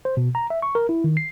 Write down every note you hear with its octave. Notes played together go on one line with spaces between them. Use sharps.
C5
B2
A#5
E5
C#6
A#4
E4
D#3
C7